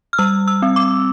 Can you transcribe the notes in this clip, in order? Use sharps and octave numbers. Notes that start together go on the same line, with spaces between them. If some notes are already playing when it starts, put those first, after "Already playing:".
F6
G3 E6
E6
C4
D6